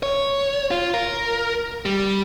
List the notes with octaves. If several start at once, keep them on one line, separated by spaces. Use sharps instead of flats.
C#5
F4
A#4
G3